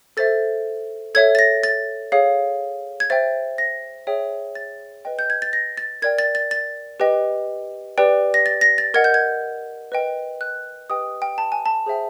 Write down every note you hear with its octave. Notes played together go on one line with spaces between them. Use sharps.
A4 C5 E5 A6
A4 C#5 E5 G#6
A6
A#6
A6
G#4 C#5 F5
G#6
C5 E5 G5 A6
A#6
G#4 C#5 E5 G5
A6
B4 D#5 G5
G6
G#6
A6
A#6
A6
A#4 D5 G5 G#6
A6
A6
A6
G4 B4 D#5 G5
G4 B4 D5 G5
A#6
A6
A#6
A6
A#4 D#5 F#5 G#6
G6
G#6
B4 D#5 G5
F#6
G4 B4 D#5 G5 D#6
G5
A5
G#5
A5
G#4 C5 E5 G5